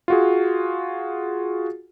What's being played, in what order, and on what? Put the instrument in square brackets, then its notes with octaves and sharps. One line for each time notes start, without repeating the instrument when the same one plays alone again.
[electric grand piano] F4 F#4 G#4